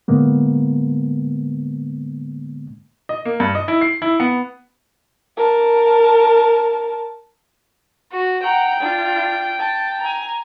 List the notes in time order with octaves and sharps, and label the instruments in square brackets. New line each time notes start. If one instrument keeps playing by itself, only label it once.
[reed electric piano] A2 D3 G#3 A#3 B3
[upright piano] D#5
A#3
G2
D#5
E4
C7
E4
B3
[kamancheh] A#4 A5
[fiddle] F#4
[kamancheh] F#5 A#5 [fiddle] G5
[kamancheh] D4 F4
A5
G#5 A#5